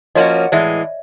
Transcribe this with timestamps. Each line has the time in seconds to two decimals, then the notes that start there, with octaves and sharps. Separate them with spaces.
0.15 F3 A#3 C#4 F#4 C#5 D#5
0.52 A2 E3 G#3 D5 E5